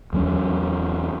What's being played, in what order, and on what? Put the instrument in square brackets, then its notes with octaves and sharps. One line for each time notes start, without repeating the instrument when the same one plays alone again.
[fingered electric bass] E2 F#3 G#3 C#4